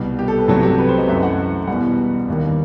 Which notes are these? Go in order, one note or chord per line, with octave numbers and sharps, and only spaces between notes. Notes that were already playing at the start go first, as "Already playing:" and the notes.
Already playing: C2 B2 G3
G4
A4
B4
C2 C3 F#3 A3 A4
G4
B4
C5
D#5
F#2 E3 A3 E5
F#5
E2 B2 G3 F#5
D#2 D#3 G3